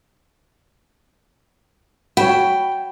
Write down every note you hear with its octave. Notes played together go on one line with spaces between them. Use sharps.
F#4 C#5 F#5 G5 B5